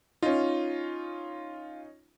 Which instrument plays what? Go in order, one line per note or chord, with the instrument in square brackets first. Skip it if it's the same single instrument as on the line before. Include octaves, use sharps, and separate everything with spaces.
[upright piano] C#4 D#4 [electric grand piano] F4